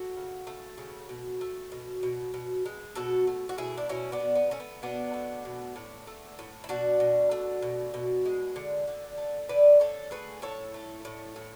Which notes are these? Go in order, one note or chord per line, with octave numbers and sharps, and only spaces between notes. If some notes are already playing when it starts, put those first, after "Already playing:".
Already playing: F#4 A4
C#3
A3
C#3
B2
A3
B2
B2
B2
G#3
B2 F#4 A4
A3
F#4
B2 E4 G#4
D4
B2 C#4 E4
B3 D4
B2
B3
A3 C#4
B3
B2 B3 D4
A3
B2
A2
A3
A2
E4
B2 D4 F#4
B2
A3
B2
B2
G#3
D3
D3
A3
D3 B4 D5
D3 A4 C#5
A3 G#4 B4
A2 A4 C#5
A3
A2
A2